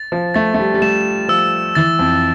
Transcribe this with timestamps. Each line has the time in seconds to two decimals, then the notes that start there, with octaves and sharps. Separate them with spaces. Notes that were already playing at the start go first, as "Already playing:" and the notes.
Already playing: A6
0.12 F3
0.34 A3 A6
0.54 A3
0.59 G3
0.74 G3
0.82 A3 E7
1.28 F3 E6
1.75 E3 A6
1.99 F2